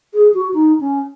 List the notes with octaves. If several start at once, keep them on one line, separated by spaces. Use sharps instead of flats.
G#4
F#4
D#4
C#4